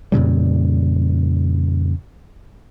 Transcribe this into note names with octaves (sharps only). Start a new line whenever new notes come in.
F2 A#2 C#3 G3